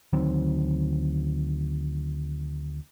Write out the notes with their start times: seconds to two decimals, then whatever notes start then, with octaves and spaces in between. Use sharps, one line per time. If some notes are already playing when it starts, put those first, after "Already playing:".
0.13 D2 D#3 F#3 C4